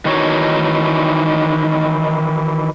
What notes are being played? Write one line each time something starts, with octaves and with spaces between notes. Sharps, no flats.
D#3 E3 D#4 F#4 C#5